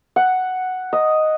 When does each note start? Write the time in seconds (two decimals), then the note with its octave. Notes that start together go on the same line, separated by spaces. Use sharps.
0.16 F#5
0.93 D#5